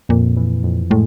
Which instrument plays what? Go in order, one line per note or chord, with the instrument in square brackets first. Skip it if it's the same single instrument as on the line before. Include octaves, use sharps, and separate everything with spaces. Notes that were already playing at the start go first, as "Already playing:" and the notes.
[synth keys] F2 [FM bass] A#2
[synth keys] E3
F2
[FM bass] A2 [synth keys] G#3